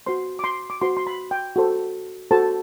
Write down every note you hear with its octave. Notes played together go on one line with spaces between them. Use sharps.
F#4 C5 C6
D6
C6
D6
F#4 C5 C6
C6
B5
G5
F#4 A4 C5
F#4 A4 C5 A5